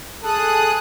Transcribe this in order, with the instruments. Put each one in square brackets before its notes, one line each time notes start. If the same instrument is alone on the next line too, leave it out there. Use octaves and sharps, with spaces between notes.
[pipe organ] G#4 D#6 F#6 [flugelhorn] A4